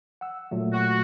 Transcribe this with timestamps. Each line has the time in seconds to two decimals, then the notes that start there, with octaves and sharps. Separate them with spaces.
0.21 F#5 E6
0.51 A#2 F#3 A3
0.73 F#4